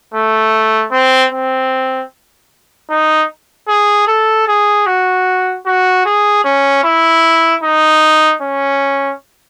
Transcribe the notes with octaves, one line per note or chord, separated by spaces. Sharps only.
A3
C4
C4
D#4
G#4
A4
G#4
F#4
F#4
G#4
C#4
E4
D#4
C#4